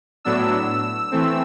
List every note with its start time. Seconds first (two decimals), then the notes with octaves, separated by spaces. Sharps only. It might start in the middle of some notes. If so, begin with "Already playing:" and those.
0.25 A2 F#3 B3 D4 E6
1.11 E3 A3 C4